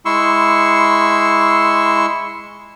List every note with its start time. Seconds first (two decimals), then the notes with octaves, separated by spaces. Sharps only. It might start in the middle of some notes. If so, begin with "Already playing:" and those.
0.05 G#3 E4 C6 C#6 E6